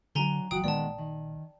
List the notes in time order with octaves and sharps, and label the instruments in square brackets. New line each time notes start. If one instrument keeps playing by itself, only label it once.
[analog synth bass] D3 [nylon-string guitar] F#3 D4 C#5 [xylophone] G#5 A#5 G7
[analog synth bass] G1 [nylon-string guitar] E3 F#3 F#4 [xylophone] G5 D#6
[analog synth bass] A#1 [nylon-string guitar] D#3 G#3 B3 [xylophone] D5 A5
[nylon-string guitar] D#3